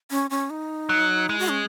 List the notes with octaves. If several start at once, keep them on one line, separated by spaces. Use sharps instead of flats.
C#4
C#4
D#4
F#3
G#3 E4
F#4
C#4